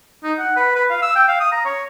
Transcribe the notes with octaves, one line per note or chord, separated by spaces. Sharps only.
D#4
F#5
B4
B4
F5
E6
G5
F5
D#6
A#5
C#5